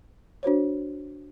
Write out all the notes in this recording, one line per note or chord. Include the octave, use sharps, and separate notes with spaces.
D4 F#4 C5 C#5